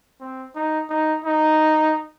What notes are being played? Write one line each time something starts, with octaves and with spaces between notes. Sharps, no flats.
C4
D#4
D#4
D#4